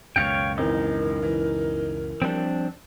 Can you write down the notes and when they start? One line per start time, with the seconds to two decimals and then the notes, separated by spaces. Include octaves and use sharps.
0.16 C#2 F#2 B2 C#5 F5 G5 F6 C#7
0.58 G#1 E3 D#4 A#4
1.22 E3
2.22 F3 G3 C4 D4